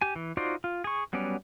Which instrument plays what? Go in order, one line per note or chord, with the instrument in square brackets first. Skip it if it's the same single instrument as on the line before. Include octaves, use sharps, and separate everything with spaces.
[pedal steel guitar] G4 G#5
E3
D#4 F4 F#4 C5 D5
F4
G#4 C#6
F#3 G3 B3 C#4 D5